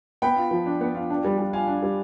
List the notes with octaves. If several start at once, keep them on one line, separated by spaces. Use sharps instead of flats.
B3 G5 B5
F4
F3
D4
B3
F4
D4
G3
G3
F4 F5 G#5
D4
G3